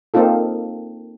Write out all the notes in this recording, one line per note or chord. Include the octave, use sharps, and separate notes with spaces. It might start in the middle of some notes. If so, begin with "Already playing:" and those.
A#3 C4 D#4 F4 A4